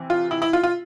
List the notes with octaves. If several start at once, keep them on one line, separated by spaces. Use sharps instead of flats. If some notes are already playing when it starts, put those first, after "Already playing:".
Already playing: C3 E3
F4
E4
E4
F4
F4